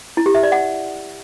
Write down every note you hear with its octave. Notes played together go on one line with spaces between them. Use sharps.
E4
G4
E5
D5
F#5